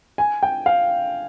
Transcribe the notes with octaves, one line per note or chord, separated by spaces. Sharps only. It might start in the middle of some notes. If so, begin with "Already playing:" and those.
G#5
G5
F5